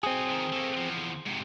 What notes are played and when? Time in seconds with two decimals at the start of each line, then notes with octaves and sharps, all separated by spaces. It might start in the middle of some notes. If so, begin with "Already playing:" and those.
0.03 F#3 C4 G#4 D#5
0.31 D#3 F3
0.52 A3 A#3
0.77 E2 F3
1.26 G#2 C3